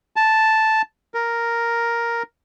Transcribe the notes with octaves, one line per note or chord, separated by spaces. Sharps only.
A5
A#4